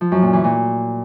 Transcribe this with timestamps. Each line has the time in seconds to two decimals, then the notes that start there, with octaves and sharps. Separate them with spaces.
0.01 F3
0.12 F#2
0.22 A#2
0.33 E3
0.44 A#2